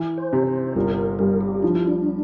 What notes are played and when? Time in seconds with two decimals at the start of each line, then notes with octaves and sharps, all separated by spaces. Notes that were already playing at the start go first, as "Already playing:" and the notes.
Already playing: E3
0.17 C5
0.33 C3
0.47 C5
0.76 G1 A#4
0.97 A#4
1.19 G2 A#4
1.41 G4
1.62 F3 D4
1.75 E4
1.87 D4